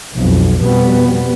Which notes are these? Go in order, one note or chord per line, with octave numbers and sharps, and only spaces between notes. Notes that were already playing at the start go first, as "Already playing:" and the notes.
B1 F2
F2 B2 G3 B3